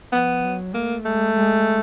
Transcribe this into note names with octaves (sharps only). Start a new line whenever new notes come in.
F3 B3
F#3
A3 A#3
G#3 A3
G#3